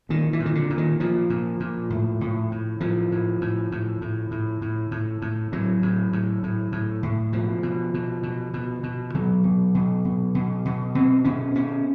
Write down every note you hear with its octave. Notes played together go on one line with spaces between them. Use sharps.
A#2 D#3
E3
A#2
D#3
D3
A#2
D#3
A#2 F3
A#2
A#2
A2
A2
A2
A2 F3
A2
A2
A2
A2
A2
A2
A2
A2
A2 F#3
A2
A2
A2
A2
A2
B2 F3
B2
B2
B2
B2
B2
B2 F#3
B2
B2
B2
B2
B2
B2 C4
B2 C#4
B2 C#4